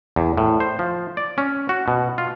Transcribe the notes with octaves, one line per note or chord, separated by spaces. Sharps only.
E2
A2
C5
F3
D5
C#4
F#4
B2
F4